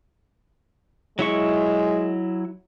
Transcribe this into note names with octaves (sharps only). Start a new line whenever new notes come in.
F#3 G#3 E4 C#6